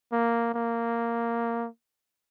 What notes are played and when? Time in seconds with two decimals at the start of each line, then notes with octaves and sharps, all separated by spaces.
0.12 A#3
0.54 A#3